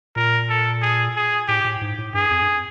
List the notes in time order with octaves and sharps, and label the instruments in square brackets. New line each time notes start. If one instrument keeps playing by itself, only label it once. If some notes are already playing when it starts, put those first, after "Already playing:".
[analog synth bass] A#2 [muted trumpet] A#4
[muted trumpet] A4
G#4
G#4
[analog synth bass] A2 [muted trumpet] G4
[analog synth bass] A2
G#2
A2
[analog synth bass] G2 [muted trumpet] G#4
[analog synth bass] F2
G2